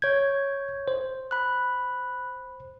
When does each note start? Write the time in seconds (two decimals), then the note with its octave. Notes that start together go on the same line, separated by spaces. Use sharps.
0.02 C#5 G6 G#6
0.88 C5
1.31 B5 F#6